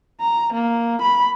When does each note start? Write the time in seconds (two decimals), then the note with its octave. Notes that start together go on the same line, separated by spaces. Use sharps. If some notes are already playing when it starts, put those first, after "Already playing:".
0.20 A#5
0.54 A#3
1.02 B5